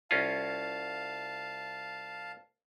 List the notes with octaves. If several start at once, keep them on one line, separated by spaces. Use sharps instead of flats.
C2 C#4 F4 F5 A5